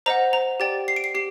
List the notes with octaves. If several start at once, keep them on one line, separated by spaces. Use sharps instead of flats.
C5 D#5 F#5 A#5
A#5
G4 D5 G5 A6
C7
D7
C7
G4 C7